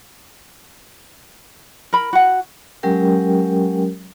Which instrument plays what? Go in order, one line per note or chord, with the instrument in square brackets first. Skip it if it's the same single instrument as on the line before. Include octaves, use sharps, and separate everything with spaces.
[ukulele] A#4 B5
F#4 F#5
[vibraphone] F#3 G#3 C#4 G4 A#4 G5